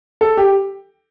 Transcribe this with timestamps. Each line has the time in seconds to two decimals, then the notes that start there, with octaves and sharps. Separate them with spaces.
0.21 A4
0.37 G4